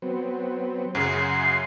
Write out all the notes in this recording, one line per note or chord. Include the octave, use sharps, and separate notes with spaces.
F#3 B3 C4
F#2 C#3 F#5 G#5 C6 C7